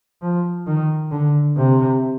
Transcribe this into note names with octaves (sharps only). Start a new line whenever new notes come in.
F3
D#3
D3
C3